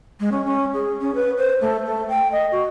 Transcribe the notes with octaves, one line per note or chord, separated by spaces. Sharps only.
G#3
C#4
C#4
G#4
C#4
B4
C5
A3
A3
G5
D#5
F#4